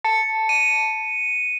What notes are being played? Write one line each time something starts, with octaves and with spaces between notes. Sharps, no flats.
A5 C#7
D#7